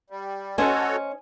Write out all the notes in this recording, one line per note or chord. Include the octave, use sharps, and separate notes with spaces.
G3
C#4 F#4 A4 C5 C#5 D#5 G#5